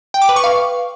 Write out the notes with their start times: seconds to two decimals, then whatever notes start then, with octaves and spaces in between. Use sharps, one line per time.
0.14 G5
0.22 D6
0.29 B4
0.36 C#6
0.44 F5